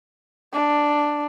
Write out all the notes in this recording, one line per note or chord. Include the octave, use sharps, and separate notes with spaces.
D4